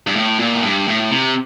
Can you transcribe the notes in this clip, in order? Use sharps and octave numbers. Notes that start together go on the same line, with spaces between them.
G2
A2
A#2
A2
G2
A2
C3